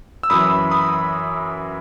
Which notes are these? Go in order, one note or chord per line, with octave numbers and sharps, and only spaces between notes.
E6
F#2 E3 B5 D#6
B5 D#6